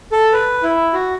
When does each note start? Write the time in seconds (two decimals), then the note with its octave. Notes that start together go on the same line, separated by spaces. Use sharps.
0.12 A4
0.32 B4
0.63 E4
0.93 F#4